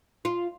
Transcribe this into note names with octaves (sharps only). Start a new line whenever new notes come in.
F4